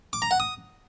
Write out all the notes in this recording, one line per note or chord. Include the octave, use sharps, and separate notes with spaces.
D6
A#5
F#5
D#6